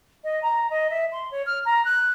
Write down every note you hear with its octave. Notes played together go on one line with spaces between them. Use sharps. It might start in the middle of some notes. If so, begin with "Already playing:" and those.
D#5
A#5
D#5
E5
C6
C#5
F6
A#5
F#6